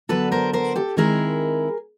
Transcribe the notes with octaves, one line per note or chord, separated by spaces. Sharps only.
D3 F#3 B3 D4 A4 B4
A#4 C5
A#4 C5
G4 A4
D#3 G#3 C4 E4 G#4 A#4